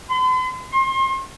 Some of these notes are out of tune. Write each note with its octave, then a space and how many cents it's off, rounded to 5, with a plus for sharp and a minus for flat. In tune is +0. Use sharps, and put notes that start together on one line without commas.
C6 -45
C6 +35